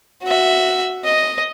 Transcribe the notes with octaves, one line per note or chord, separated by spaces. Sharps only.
F#4 E5
D#5